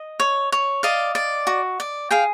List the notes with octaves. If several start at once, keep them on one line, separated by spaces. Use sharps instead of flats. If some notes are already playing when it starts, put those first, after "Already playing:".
Already playing: D#5
C#5
C#5
D5 D#5 F5
D5
F#4
D5
G#4 F5 G5